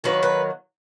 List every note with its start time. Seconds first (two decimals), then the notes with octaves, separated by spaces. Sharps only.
0.04 D#3 F#3 A#3 B4
0.23 B4